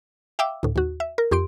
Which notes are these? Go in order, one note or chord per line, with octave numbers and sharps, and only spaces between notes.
E5 F5 G5 D6 E6
D2 A2
D#2 F#4
E5
A#4
F2 G4 C6 D7